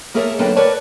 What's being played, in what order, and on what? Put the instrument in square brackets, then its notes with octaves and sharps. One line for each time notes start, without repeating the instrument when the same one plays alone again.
[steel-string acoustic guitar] A#3 G#4 A#4 C#5 E5 A5
F#2 D3 A#3 B4 G5 A5
A#4 B4 C#5 D5 A5